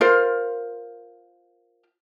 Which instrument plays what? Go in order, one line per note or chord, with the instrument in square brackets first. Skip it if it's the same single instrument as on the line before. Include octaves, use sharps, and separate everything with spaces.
[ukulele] F4 A#4 C5